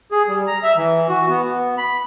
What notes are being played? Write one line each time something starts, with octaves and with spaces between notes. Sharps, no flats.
G#4
G3
A#5
E5
E3
F#4
B3
B3
B5